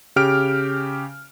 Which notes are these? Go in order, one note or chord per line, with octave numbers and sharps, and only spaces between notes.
C#3 G4 F6 D7